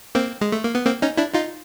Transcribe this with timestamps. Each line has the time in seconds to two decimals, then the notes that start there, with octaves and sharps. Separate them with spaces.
0.15 A#3 C4
0.41 G#3
0.52 A3
0.64 A#3
0.75 B3
0.86 A#3 C4
1.02 C#4 D#4
1.18 D4 E4
1.34 D#4 F4